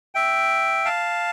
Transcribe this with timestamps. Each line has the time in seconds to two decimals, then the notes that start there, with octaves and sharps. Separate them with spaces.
0.15 E5 G5
0.85 F5 A5